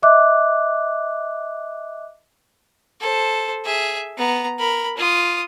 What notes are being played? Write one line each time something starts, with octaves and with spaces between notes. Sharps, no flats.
D#5 E5 D6 F#6
A4 C5
G#4 E5
B3 A#5
A#4 B5
F4 D#6